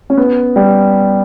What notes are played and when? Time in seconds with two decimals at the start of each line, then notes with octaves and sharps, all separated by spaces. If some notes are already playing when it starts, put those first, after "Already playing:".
0.10 C#4
0.17 B3
0.56 G3